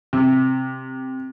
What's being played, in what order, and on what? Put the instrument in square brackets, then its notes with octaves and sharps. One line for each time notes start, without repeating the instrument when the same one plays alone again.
[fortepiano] C3